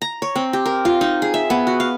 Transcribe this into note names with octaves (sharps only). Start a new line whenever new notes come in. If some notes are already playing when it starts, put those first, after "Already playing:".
A#5
C#5
C4
G4
A#4
F4
D#4
G#4
E5
B3
F#4
F5